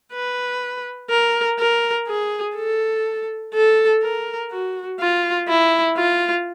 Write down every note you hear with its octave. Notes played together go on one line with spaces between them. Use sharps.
B4
A#4
A#4
G#4
A4
A4
A#4
F#4
F4
E4
F4